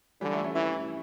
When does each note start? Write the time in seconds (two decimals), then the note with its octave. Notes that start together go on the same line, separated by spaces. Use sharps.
0.21 D3 E3 G3
0.33 F3 A3
0.44 A3 C#4
0.55 E3 C#4 E4